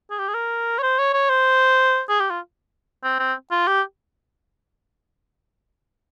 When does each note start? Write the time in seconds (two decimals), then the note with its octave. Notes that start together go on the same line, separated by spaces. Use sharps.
0.10 G#4
0.19 G4
0.28 G#4
0.34 A#4
0.79 C#5
0.82 C5
0.99 C#5
1.13 C#5
1.30 C5
2.09 G#4
2.20 G4
2.30 F4
3.04 C4
3.19 C4
3.51 F4
3.67 G4